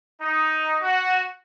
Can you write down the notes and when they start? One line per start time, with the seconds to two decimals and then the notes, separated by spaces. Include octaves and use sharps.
0.21 D#4
0.82 F#4